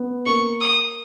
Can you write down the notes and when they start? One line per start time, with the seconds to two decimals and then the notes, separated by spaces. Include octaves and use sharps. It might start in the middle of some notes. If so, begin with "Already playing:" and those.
Already playing: B3
0.26 A#3 C#6
0.61 D#6